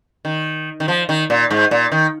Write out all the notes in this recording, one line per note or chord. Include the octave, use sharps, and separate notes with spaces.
D#3
D#3
F3
D#3
A#2
G#2
A#2
D#3